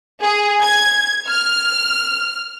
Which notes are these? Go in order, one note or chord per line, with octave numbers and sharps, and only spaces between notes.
G#4
G#6
F6